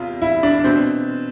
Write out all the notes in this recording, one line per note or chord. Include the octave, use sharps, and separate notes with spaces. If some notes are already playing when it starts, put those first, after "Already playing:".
Already playing: E2 C3 F4
E4
D4
B2 C4